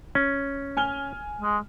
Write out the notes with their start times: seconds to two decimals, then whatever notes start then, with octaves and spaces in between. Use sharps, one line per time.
0.15 C#4
0.77 G#5 F6 G7
1.41 G#3